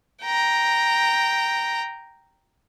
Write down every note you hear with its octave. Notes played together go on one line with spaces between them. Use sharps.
G5 A#5